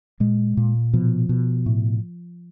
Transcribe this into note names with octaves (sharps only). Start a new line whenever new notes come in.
A#2 G#3
A#2
B2 F3
B2
A2